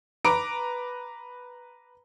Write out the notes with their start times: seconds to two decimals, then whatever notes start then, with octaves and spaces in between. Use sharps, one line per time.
0.25 B4 A#5 D6 D7